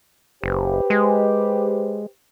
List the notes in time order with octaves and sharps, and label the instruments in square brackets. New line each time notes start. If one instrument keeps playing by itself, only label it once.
[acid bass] F#1 [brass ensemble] G4 B4 C5
[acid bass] G#3